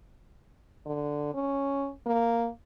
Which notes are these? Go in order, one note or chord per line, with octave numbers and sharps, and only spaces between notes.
D3
C#4
A#3